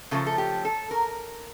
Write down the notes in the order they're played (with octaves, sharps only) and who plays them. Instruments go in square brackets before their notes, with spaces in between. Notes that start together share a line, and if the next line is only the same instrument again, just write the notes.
[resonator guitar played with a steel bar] C#3 F3 A3 A4
A4
G4
A4
A#4